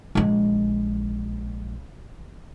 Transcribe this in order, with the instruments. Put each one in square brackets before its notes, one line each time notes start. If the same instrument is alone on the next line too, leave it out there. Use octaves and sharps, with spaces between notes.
[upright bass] A#1 G#3